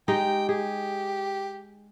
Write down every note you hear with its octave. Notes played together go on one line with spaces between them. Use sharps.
G#3 D#4 G4 G5
G4 G#4